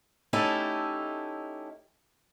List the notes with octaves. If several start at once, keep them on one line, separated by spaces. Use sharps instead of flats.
A3 C#4 D#4 E4 G4 A4